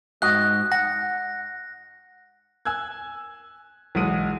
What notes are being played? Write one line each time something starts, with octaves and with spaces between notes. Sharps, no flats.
G#2 F#4 D#5 F#6
F#5 A#6
G#5 E6 F#6 G#6
B1 E2 G#3 F#5 D#6 D#7